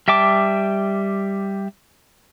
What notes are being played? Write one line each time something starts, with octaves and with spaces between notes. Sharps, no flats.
G3 E5 G5 A5 D6